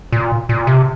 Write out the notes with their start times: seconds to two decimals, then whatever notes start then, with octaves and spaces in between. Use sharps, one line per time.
0.12 A#2
0.49 A#2
0.67 C3